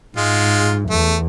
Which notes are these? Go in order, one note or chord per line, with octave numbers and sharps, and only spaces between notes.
G#2 G#3 F4
E2 A3